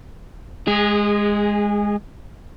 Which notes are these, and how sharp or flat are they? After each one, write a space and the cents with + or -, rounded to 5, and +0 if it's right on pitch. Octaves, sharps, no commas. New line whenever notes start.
G#3 +0 G#4 -25